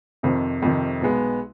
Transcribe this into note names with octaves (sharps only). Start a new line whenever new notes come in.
F2 C3 D#3
F2 C3 D#3
B1 B2 G#3 B3